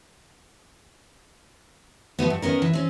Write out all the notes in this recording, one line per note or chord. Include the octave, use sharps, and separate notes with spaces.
F3 G#3 A3 B3
G2
D#3 B3 C#4 A#4
E3
C4 C#4